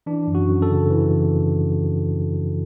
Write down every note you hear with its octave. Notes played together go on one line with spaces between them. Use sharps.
E3 D4
F#2
F#4
F#2
A4
C#3
E3